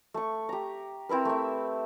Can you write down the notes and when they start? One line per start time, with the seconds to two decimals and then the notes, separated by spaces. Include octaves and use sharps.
0.14 A3 C#6
0.49 G4 A#5
1.09 C4 E4 A#4 B4
1.25 A3 E5